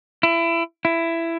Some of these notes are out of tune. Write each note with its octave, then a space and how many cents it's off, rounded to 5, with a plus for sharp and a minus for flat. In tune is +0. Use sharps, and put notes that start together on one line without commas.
E4 +25
E4 +15